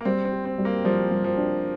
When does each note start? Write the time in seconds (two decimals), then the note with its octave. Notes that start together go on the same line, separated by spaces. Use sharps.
0.01 A#3
0.05 G3 C4
0.25 C4
0.32 G4
0.45 C4
0.58 G3
0.65 A#3
0.85 F3 G3
1.11 G3
1.24 F3
1.38 D4